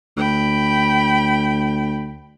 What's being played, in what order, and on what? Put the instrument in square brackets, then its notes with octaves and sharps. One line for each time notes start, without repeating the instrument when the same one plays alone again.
[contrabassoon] D2 [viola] G5 B5